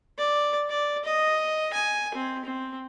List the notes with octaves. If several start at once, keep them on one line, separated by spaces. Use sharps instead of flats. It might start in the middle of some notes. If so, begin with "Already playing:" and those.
D5
D5
D#5
G#5
C4
C4